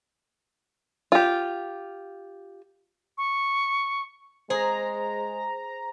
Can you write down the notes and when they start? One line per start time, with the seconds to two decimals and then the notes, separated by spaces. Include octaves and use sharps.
1.12 F4 G4
3.18 C#6
4.50 G#3 G#4 C5 A#5